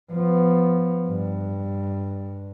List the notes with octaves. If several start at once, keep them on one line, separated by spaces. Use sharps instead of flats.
F3 B3
G2